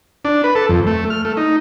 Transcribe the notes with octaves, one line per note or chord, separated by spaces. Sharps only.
D4
B4
A4
F2
A3
F6
A3
D#4